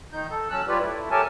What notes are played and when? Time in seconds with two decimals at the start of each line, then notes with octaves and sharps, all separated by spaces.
0.12 D#3 D#4 G6
0.30 A4
0.50 F#3 C#4 A5 E6 F#6
0.68 G3 F4 G4 B4 C#5 D5
0.81 A3 E4
1.11 G4 A4 A#4 C#5 G#5 A5